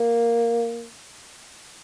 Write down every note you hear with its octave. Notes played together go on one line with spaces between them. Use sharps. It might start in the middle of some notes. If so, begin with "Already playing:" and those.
Already playing: A#3